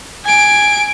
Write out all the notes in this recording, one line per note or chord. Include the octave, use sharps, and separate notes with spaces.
G#5 D7